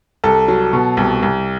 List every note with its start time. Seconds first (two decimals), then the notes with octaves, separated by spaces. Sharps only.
0.24 C2 A4
0.48 F#3
0.73 B2
0.97 C2
1.23 C2